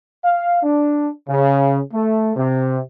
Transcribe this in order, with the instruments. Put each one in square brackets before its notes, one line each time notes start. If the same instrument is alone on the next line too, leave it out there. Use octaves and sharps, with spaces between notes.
[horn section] F5
D4
C#3
A3
C3